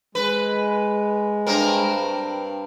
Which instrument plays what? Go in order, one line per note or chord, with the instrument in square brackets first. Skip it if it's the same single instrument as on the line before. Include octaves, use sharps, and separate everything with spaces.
[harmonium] G#3 [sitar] B4
[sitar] G2 C4 A#4